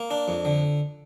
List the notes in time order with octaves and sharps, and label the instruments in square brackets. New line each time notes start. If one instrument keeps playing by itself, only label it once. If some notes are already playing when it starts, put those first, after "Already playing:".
Already playing: [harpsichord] A#3
D4
F2
D3